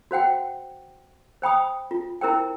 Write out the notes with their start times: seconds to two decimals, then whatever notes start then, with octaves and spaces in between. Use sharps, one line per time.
0.11 F#4 C5 F#5 G5
1.42 C5 G5 B5 D#6
1.91 F4
2.21 E4 A#4 C5 G5